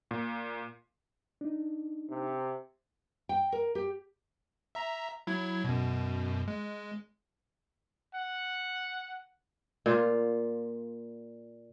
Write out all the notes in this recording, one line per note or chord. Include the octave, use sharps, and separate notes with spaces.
A#2
D4 D#4
C3
G5
A#4
G4
E5 A#5
F#3 E4 G#6
F#2 B2
G#3
F#5
A#2 F4